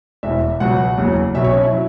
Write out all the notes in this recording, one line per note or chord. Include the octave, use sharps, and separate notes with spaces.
E1 E2 E3 E5
C#2 B2 F#3 F#5
F#1 E2 C#3 F#3
B1 B2 F#3 E5
C#5
C#4
E4
F#3